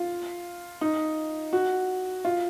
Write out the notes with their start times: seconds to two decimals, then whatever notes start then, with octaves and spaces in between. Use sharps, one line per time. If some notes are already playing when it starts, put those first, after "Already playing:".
Already playing: F4
0.81 D#4
1.53 F#4
2.25 F4